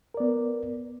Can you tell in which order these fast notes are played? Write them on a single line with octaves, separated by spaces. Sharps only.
A#4 D5 B3